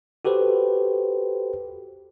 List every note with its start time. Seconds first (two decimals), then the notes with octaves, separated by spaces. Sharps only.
0.25 F#4 G4 A4 B4 C5